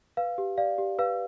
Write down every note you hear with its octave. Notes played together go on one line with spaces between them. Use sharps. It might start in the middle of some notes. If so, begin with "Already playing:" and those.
B4 F5
G4
D5 F5
G4
B4 F5